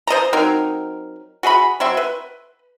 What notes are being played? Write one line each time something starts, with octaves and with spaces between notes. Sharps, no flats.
C5 D#5 A5 A#5
F#3 C4 D#4 A#4
F#4 G#4 D#5 B5
F#3 C4 E5 C6
B4